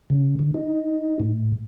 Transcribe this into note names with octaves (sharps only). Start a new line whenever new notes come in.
C#3
D3
D#4
A2